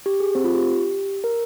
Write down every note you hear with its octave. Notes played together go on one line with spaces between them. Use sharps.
G4
G#4
C4 C5
F4
G4
A#4